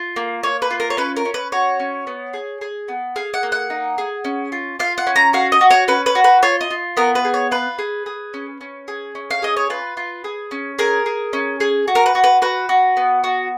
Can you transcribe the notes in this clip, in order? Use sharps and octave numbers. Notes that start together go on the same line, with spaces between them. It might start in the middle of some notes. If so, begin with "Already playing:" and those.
Already playing: F4
A#3
A#3 C#5
B4
F4
A#4
C#5
C#4 B4
A#4
C#4
B4
F#4 C#5
C#4
B3
G#4
G#4
B3
G#4 F5
F#5
A#3
F#5
D#4
G#4
C#4
F4
F4 F5
F#5
C#4
A#5
F#4 F5
D#5
F#4
C#5
C#4 B4
B4
F#4
B4
F4 C#5
D#5
F4
B3 A#4
B4
G#4
C#5
F4 B4
G#4
G#4
C#4
C#4
G#4
C#4
F5
G#4 D#5
C#5
F4 B4
F4
G#4
C#4
G#4 A#4
G#4
C#4
G#4
F#4
A#4
B4
F#4
B4
F#4 B4
F#4
B3
F#4